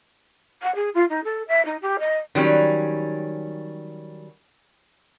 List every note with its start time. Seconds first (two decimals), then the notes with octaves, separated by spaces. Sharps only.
0.62 F#5
0.75 G#4
0.94 F4
1.09 D#4
1.24 A4
1.47 E5
1.65 D#4
1.81 G4
1.99 D#5
2.35 D#3 F#3 G3 C#4